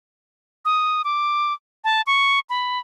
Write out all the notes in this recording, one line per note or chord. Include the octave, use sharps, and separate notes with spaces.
D#6
D6
A5
C#6
B5